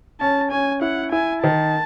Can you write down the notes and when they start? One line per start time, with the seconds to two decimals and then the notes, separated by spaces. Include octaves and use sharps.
0.20 C#4 A5
0.51 C#4 G#5
0.81 E4 F#5
1.12 E4 G#5
1.43 D#3 A5